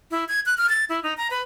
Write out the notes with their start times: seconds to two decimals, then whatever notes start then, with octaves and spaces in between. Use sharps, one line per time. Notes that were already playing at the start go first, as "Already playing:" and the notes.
0.11 E4
0.29 G#6
0.46 F#6
0.58 F6
0.69 A6
0.89 E4
1.03 D#4
1.17 A#5
1.31 B4